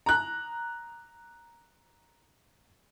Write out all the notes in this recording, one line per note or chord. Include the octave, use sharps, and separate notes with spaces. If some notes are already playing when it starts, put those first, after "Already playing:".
A#5 F#6